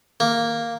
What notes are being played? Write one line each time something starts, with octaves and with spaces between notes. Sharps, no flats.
A#3